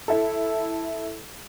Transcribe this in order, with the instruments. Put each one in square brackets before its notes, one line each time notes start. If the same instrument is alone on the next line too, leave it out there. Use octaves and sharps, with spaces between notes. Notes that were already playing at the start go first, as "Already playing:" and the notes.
[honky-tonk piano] E4 A4